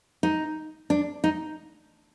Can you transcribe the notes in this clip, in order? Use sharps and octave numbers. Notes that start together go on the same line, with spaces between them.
D#4
D4
D#4